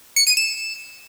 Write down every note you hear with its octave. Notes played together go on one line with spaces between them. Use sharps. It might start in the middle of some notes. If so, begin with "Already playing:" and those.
C#7
D#7
E7